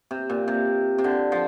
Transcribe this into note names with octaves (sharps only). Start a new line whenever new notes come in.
C3
A#2
C3
C3
D3
F3